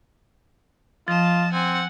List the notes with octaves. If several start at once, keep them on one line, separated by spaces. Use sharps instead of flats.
F3 F4 D#5 A5
C4 F#5 G#5